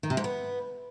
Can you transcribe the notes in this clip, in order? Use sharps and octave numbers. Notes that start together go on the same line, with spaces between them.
D#3
C3
G#2
B3